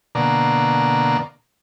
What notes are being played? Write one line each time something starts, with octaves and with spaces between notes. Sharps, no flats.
B2 D3 A#3 D5 A#5